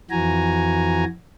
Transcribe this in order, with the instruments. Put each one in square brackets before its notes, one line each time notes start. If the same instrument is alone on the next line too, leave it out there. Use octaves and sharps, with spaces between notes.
[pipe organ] F2 E3 F#4 G#5 A#5